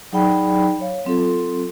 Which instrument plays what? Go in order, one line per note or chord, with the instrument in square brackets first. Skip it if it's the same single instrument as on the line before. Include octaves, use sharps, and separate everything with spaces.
[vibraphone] F#3 D#4 G#4 D5 G5 B5
C#5 F5
F#3 C4 F4 A4